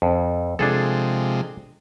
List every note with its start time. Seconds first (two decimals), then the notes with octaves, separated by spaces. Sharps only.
0.02 F2
0.59 C3 F3 G#3 D4 G#4 A4